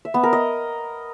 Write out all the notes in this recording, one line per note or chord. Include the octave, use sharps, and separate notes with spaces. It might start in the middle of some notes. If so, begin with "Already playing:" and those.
E5
B3
A#4
D#5